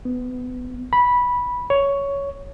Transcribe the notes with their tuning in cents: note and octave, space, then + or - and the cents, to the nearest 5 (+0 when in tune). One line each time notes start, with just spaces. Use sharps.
B3 +25
B5 -10
C#5 +10